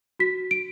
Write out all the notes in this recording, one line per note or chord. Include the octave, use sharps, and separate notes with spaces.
F#4 B6
D7